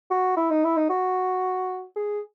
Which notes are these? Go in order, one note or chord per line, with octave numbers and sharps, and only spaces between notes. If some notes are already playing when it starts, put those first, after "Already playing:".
F#4
E4
D#4
E4
D#4
F#4
G#4